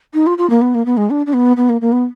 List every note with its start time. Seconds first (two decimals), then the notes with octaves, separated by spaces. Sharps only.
0.14 D#4
0.27 F4
0.38 F4
0.50 A#3
0.61 B3
0.75 A#3
0.86 B3
0.97 G#3
1.10 D4
1.26 D4
1.33 B3
1.57 B3
1.69 A#3
1.81 A#3
1.92 B3